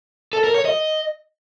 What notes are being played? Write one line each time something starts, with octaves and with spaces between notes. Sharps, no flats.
A4
A#4
C#5
D#5